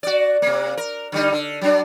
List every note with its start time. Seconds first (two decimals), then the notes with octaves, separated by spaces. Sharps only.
0.03 F#4 D5
0.42 C3 A#3
0.77 A#4
1.12 D3 G3 D#4
1.32 D3
1.61 F#3 D4